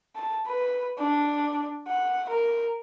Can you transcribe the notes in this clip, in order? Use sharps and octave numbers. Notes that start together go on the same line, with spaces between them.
A5
B4
D4
F#5
A#4